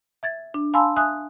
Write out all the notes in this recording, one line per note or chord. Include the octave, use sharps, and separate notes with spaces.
E5 G#6 A6
D4
F5 G#5 A5 B5 C6 E6
E5 G#5 D#6 F#6